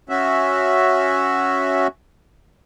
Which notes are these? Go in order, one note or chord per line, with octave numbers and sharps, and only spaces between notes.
C#4 F#4 E5